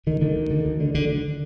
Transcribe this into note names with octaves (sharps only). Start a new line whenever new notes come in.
D2 D#3
D3 D#3
D2
D3
D2
D3
D2 D3
D3